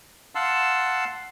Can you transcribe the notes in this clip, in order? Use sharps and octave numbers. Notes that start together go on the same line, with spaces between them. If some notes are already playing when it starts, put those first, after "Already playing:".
F5 F#5 A5 C6 E6